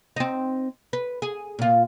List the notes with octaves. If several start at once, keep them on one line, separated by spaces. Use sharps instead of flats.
C4 D#4
B4
G#4
A#2 F4